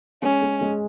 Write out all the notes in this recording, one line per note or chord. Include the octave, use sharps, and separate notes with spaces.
G#3 C#4
G#3
G#3